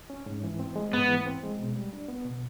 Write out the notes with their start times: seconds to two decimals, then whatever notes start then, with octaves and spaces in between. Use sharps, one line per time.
0.10 C#4
0.26 G#2
0.43 E3
0.59 C4
0.76 G#3
0.92 G#2 B3
1.09 E3
1.26 C4
1.43 G#3
1.59 B2
1.76 G3
1.93 D4
2.08 B3
2.25 B2